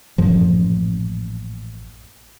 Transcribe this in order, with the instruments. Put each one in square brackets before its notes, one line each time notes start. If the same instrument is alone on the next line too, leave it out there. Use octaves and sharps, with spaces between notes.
[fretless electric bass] A1 F#2 A#2 F3